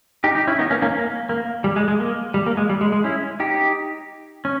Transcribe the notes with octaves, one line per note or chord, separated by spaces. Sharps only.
D#4 G4
D#4 G4
C#4 E4
B3 D#4
A#3 C#4
A#3 C#4
A#3
A#3
G3
G#3
G#3
A#3
G3
A#3
G#3
G3
G#3
G#3
C#4 E4
D#4 G4
C#4